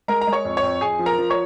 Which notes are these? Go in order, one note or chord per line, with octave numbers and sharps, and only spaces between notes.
G#3 A#4 A#5
A#5
G#3
C#5 C#6
F2
C#5 C#6
F2
F2 G#4 G#5
F3
A#4 A#5
F3
C#5 C#6